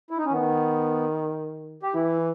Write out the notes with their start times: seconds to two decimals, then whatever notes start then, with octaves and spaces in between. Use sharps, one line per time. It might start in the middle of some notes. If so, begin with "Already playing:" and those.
0.11 E4
0.18 D#4
0.25 C#4
0.32 D#3 B3
1.83 G4
1.94 E3 E4